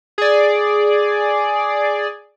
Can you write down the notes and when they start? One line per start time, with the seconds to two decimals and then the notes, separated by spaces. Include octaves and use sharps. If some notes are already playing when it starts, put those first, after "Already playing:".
0.18 G#4 D5